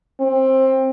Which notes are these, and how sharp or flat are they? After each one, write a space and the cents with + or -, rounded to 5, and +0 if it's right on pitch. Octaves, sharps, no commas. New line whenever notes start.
C4 +15